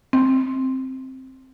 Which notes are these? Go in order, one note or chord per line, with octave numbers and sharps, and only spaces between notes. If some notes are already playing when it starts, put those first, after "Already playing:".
C4